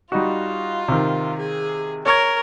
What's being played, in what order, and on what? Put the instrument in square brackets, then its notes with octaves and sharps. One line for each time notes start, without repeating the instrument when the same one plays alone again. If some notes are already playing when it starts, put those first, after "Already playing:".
[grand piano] G3 D#4 F#4 [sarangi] F4
[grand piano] C3 D#3
[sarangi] G#4
[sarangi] A#4 [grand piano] C#5 C#6 G#6